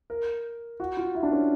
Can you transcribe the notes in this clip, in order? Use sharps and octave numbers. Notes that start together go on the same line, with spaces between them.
A#4
F#4
F4
E4
D4
C#4